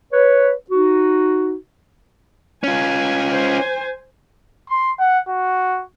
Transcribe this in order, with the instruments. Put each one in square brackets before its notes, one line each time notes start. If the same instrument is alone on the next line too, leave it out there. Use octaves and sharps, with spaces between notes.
[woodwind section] B4 C#5
D#4 F#4
[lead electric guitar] C#4 F4 [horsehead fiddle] G#5
[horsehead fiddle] C5 G#5
[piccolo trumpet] C6
F#5
F#4